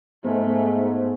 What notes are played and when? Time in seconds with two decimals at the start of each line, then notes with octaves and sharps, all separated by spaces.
0.25 G#2 A3 B3